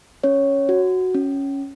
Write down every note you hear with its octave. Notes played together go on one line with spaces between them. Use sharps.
C#4 C#5
F#4
C#4